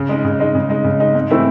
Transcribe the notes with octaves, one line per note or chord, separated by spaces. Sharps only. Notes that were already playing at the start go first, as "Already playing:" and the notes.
Already playing: C#3
G#3 D#4
C#3
G#3 D#4
C#3
G#3 D#4
C#3
G#3 D#4
G#2
E3 A3 C4 E4